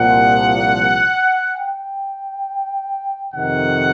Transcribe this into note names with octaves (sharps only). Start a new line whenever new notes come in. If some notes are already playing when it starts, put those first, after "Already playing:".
Already playing: C2 A#2 F3 F#5
G5
F2 C3 D#3 F#5